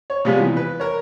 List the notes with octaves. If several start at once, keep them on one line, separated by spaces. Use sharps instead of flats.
C#5
C3 F3 G3 G#3 B3
E3
B4
A#4 C#5